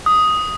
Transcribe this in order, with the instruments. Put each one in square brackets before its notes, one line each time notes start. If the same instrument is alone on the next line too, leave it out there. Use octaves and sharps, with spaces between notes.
[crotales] D#6